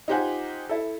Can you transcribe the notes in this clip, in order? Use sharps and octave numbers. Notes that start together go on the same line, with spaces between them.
D#4 F4 G4 C5 F#5 G#5
E4 A4